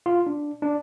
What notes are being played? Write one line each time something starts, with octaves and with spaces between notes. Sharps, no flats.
F4
D4
D4